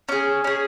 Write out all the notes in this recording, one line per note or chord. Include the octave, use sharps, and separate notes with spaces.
C#4 G#4
C#4 G#4